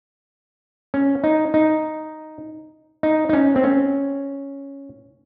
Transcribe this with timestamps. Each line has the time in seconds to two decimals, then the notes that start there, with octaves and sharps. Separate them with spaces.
0.94 C#4
1.24 D#4
1.54 D#4
3.03 D#4
3.29 D#4
3.33 C#4
3.56 C4
3.63 C#4